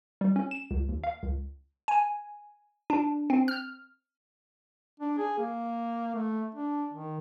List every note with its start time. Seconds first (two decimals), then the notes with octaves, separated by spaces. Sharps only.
0.21 G3
0.36 C#4
0.51 E7
0.71 C#2
0.89 D#2
1.04 F5
1.23 C#2
1.88 G#5
2.90 D4
3.30 C4
3.48 F6
5.00 D4
5.18 G#4
5.38 A#3
6.15 A3
6.55 D4
6.93 D#3